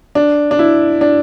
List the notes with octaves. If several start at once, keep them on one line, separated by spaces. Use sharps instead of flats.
D4
D4
E4
D4